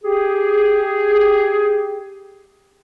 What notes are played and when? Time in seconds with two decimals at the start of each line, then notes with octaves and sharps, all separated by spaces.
0.04 G4 G#4